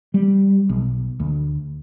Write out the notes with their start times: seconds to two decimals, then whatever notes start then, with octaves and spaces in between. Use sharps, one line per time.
0.14 G3
0.70 B1
1.20 D2